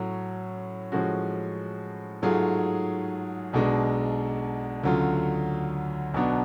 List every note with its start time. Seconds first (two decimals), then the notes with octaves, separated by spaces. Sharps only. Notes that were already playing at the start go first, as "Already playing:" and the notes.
Already playing: A2 F#3 C#4
0.92 A2 F3 G#3 C#4 F#4
2.22 G#2 F#3 A3 F4 G#4
3.53 B1 B2 G#3 D4
4.83 D2 C#3 F#3 A3 F4
6.14 B1 B2 F#3 B3 D4